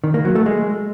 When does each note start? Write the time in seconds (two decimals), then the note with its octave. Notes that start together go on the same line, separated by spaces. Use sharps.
0.04 D#3
0.14 A#3
0.25 F#3
0.35 A3
0.46 G#3